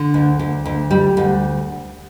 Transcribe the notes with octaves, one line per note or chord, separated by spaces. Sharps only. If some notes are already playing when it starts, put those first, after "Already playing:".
Already playing: D3
D2
D2
D2
G3
D2